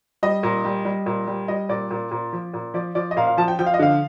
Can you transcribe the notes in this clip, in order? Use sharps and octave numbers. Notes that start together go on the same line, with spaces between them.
G3 D#5
A#2
G3
G3
A#2
G3
G3 D#5
A#2 D5
A#2
A#2
F3
A#2
F3 D5
F3 D5
D#5
A#2 F5
F5
F3 A5
G5
F3 G5
F5
D#5
D3 F5